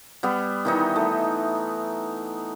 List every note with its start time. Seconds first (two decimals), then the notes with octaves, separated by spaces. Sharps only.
0.23 G3 B3
0.65 D#3 E3 D#4
0.96 A3